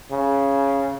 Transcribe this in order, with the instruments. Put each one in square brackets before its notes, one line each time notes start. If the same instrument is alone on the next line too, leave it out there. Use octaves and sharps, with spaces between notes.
[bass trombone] C#3